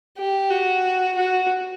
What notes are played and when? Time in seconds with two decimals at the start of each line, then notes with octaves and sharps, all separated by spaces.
0.18 G4
0.50 F#4
1.15 F#4